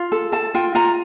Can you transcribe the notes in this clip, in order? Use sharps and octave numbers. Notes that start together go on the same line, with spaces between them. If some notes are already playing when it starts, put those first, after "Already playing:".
Already playing: F4
A4
A4 A5
F4 G5
F4 A#5